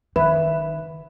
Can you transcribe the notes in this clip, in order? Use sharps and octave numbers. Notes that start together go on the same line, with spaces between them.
F#1 D#3 B4 E5